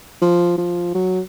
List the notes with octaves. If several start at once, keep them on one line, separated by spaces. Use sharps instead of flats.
F3
F3
F#3